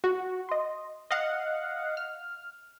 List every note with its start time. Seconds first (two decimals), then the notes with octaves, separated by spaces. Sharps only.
0.04 F#4
0.49 D#5 C6
1.11 D#5 F5 F#5
1.97 F6